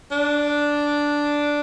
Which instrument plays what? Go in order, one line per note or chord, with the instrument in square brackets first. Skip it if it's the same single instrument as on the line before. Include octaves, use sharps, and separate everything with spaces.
[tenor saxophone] D4